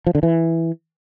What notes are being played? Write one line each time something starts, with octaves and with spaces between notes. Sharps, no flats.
F3
D3
E3